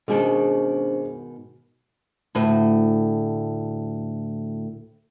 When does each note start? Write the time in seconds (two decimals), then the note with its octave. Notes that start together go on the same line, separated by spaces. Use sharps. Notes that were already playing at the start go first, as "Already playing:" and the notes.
0.08 G#2 B2 D#3 G#3 C#4 D4 C5
2.35 D2 A2